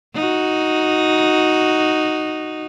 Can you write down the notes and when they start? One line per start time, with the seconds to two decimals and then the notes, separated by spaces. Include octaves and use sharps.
0.15 D#4 F#4